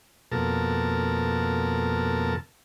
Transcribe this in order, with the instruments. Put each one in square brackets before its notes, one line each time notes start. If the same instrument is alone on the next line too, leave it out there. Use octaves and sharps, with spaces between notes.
[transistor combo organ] F2 B2 A#3 A4 A#4 A5